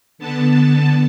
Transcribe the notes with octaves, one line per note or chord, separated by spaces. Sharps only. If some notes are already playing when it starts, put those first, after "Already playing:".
D3 B3 A5